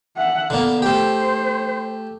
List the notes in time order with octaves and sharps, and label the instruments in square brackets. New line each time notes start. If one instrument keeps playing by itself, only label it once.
[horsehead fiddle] E5 F#5
[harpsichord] D3 A#3 [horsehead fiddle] B3
[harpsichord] A3 G4 [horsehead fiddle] C5